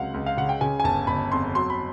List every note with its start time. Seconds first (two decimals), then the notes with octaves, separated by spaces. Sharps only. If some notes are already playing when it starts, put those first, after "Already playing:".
Already playing: C#2 C3 F#3 F5 F#5
0.14 C#2
0.26 F5
0.37 C#3 F#5
0.49 G5
0.61 C#3 G#5
0.80 G#5
0.84 G1 A5
1.07 G1 B5
1.32 F2 C6
1.55 F#3 C6
1.70 B5